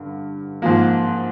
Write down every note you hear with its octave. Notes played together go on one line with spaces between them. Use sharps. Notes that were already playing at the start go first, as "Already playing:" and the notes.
Already playing: G2 D3
G#2 F3 A#3